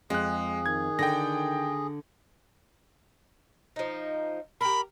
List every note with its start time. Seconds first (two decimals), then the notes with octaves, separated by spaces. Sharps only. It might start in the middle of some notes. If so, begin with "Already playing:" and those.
0.10 F2 G#3 G#4 F#6
0.66 D#3 G#6
0.99 D3 G5 A#6
3.76 F3 D#4
4.61 G4 A#4 B5